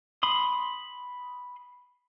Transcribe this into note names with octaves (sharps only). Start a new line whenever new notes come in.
B5 C6 D#6